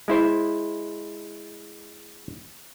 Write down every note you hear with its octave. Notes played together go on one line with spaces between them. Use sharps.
G#3 E4 C5